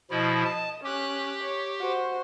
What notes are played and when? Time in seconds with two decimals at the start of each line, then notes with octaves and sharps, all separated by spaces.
0.11 B2 F3 E4 D#5
0.45 A5
0.84 C#4 G4 F#6
1.43 C#5
1.80 F#4 C5